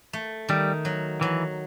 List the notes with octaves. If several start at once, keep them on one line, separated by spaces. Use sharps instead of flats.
A3
D#3 G3
F#3
E3 F#3